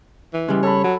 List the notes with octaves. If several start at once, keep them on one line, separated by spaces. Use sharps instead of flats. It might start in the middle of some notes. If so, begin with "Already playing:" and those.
E3
C#3 G3 G#3
A4 C#5 B5
F#3